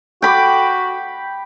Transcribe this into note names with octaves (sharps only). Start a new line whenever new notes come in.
F#4 G5 B5 D6